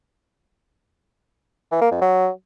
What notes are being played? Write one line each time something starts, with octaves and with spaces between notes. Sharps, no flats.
E3
A#3
F2
F#3